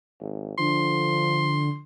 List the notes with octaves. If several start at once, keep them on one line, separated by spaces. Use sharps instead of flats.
G#1
D3 F3 C6